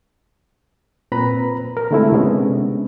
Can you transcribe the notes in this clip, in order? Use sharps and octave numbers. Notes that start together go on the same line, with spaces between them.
A#2 C4 B4 A#5 B5
A#4
D3 G#3 A3 C4 E4
C3 G#3 B3 C#4 D4